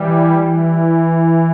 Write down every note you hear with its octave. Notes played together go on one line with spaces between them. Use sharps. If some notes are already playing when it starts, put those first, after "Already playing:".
Already playing: E3 G3
E3